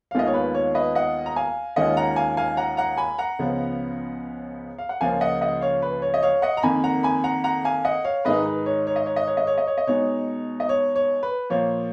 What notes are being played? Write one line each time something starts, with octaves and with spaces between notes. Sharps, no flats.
F5
D#2 D#3 G#3 B3 F4 D#5
C#5
B4
C#5
B4 D#5
D#5 F#5
A#5
F5 G#5
D#2 D#3 G#3 C#4 F4 D#5 F#5
F#5 A#5
F5 G#5
F5 G#5
F#5 A#5
F#5 A#5
G#5 B5
F#5 A#5
C#2 C#3 F3 B3
F5
F#5
C#2 C#3 F3 A#3 F4 F5 G#5
D#5 F#5
D#5 F#5
C#5 F5
B4
C#5
D#5
C#5 F5
D#5 F#5
A#5
F2 D#3 A#3 G#5 B5
F#5 A#5
G#5 B5
F#5 A#5
F#5 A#5
F5 G#5
D#5 F#5
C#5 F5
G#2 D#3 G#3 D#4 B4 D#5
B4
C#5
C#5
D#5
C#5
D#5
C#5
D#5
C#5
D#5
C#5
D#5
B2 G#3 D#4 C#5
D#5
C#5
C#5
B4
A#2 F3 A#3 C#5